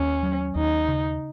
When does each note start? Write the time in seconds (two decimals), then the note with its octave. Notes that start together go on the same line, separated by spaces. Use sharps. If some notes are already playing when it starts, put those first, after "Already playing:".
Already playing: D#2 C#4
0.23 F#3
0.55 D#2 D#4
0.88 C#3